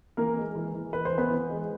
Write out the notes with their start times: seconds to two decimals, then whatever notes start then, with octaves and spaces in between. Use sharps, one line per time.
0.17 E3 A#3 A#4
0.37 G#3
0.55 E3
0.74 E3
0.93 E3 B4
1.05 C5
1.11 E3
1.18 B3 B4
1.30 E3
1.49 G#3